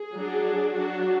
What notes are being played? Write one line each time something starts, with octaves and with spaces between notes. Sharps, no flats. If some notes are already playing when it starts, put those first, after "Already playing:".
Already playing: G#4
F#3 D4
F#3 D4 F#4